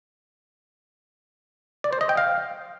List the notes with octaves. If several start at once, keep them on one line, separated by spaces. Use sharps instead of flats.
D5
C5
D#5
G5
F5